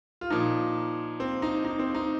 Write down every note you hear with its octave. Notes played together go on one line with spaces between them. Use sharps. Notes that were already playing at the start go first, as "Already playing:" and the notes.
F4
A#2 F3 D#4
C4
D#4
D#4
C4
D#4